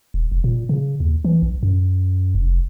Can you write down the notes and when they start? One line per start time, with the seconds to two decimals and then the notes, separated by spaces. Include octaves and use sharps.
0.14 D#1
0.32 F1
0.44 A#2
0.69 C#3
1.00 D#2
1.25 E3
1.42 A#1
1.63 F#2
2.35 F1